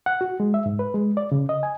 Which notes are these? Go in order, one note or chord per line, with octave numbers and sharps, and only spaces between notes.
F#5
F#4
G#3
E5
G#2
B4
G#3
D5
C#3
D#5
G#5